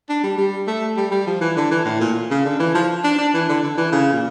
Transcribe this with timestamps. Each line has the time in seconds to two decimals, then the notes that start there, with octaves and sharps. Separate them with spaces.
0.09 D4
0.24 G3
0.37 G3
0.67 A3
0.97 G3
1.11 G3
1.27 F3
1.41 E3
1.56 D3
1.71 E3
1.85 A2
2.00 A#2
2.30 C#3
2.45 D3
2.59 E3
2.75 F3
3.04 D4
3.18 D4
3.34 E3
3.49 D3
3.63 D3
3.77 E3
3.92 C#3
4.13 A#2